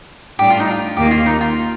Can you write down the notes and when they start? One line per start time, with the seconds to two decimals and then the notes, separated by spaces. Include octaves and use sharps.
0.39 A2 G3 D4 G4
0.50 F4
0.60 D#4
0.71 F4
0.97 D#2 D#3 A#3 G4
1.11 F4
1.26 D#4
1.41 F4